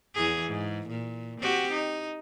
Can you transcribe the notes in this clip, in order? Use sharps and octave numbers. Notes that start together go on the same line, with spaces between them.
E2 E3 G#4
G#2
A#2
C4 F#4 G4
D#4